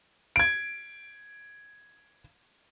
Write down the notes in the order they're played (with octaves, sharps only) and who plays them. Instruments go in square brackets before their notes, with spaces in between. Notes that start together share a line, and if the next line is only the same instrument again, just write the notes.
[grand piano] G#6 D7